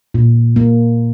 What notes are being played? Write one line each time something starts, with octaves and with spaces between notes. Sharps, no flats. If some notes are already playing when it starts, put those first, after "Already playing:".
A#2
A#3